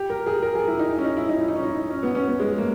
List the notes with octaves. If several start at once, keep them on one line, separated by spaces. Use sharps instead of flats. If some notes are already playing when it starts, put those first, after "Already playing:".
Already playing: G4
A#4
G#4
A#4
G#4
E4
D#4
C#4
D#4
E4
D#4
E4
D#4
C#4
D#4
C#4
B3
C#4
B3
G#3
A#3